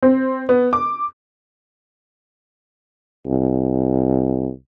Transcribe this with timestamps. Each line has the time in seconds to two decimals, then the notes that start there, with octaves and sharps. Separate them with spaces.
0.02 C4
0.49 B3
0.73 D6
3.27 C2